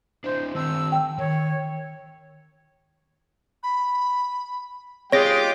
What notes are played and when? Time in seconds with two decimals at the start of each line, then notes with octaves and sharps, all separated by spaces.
0.24 D4 E4 C5
0.55 D#3 C4 A5 E6
0.92 G5
1.18 D#3 C#5
3.63 B5
5.12 G#3 F4 G4 G#4 C#5 G5 D6 A#6